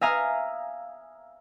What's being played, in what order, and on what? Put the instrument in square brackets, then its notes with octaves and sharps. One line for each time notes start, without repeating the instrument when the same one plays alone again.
[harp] E5 F5 G#5 A#5 D#6 F6